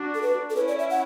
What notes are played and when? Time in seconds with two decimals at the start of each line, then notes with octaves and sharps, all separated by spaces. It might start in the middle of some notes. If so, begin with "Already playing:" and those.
Already playing: D4 F#4
0.14 A4
0.22 B4
0.50 A4
0.56 C#4 E4 B4
0.68 D5
0.79 E5
0.90 F#5